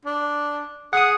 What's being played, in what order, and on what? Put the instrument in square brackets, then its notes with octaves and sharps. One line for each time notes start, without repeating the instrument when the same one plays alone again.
[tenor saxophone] D4
[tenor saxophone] G#4 [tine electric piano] F#5 D#6